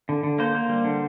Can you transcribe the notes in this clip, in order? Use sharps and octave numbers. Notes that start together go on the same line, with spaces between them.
D3
D3
A#3 C5
A#3
G3
D3